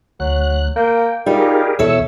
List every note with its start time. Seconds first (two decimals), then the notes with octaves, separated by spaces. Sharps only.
0.20 D2 F#3 F#6
0.76 A#3 G5
1.26 G3 D#4 F4 G4 G#4 A#4
1.79 E2 B2 E4 A4 C#5 E6